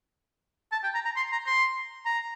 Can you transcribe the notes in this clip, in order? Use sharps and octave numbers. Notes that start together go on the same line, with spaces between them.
A5
G5
A#5
A#5
C6
A#5
C6
A#5